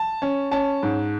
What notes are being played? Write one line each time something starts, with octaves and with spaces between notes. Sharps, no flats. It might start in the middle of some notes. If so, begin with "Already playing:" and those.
Already playing: A5
C#4
C#4 A5
G#2